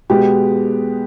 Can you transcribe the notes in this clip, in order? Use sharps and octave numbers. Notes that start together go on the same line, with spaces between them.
B2 G#3 B3 G4